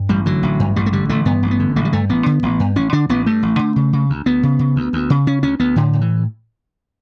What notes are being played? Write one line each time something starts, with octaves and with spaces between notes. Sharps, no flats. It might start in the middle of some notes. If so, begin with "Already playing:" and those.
Already playing: G2
A1 G3
D3 F#3
A1
G2
A1 G3
A3
D3 G3
A1 A3
G2 B3
A1
B3
D3
A1 A3
G3
G2 A3
A1 B3
D3
A1
G2
A1 C#4
D3 D4
A1 B3
G2 A3
A1
D3
C#3
C#3
D2
D2 B3
C#3
C#3
D2
D2
C#3
C#3 C#4
D2 C#4
D2 B3
A2 D3
A2
E3